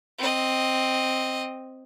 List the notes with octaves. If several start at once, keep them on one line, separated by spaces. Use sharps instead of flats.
C4 D#5